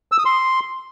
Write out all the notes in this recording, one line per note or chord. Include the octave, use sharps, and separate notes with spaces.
E6
D#6
C6